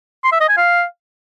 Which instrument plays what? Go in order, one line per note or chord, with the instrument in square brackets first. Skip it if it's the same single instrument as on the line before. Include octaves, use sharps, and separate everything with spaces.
[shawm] C6
E5
D#5
G#5
F5